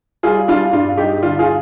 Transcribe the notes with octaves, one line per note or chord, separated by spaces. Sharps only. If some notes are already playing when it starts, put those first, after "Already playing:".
G3 F4 G#4
G3 D4 F4
G2 D4 F4
G2 D#4 G4
D3 D4 F4
F4 G#4